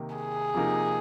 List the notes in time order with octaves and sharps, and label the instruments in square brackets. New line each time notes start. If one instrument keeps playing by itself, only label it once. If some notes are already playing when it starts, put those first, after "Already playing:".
Already playing: [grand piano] C3 D#3 A#3
[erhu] G#4
[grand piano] C3 F3 A#3 D#4